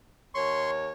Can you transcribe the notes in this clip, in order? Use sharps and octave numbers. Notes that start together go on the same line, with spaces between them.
D#2 C#5 C6 C#6